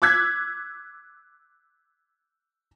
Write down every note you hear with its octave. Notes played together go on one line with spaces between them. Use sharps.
D6 E6 F#6 G#6 B6